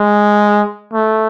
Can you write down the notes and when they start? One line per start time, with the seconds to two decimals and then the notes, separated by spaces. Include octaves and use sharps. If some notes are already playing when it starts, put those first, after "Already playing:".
Already playing: G#3
0.93 A3